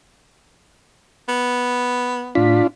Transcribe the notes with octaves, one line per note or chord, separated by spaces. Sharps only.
B3
A2 D4 F4 B6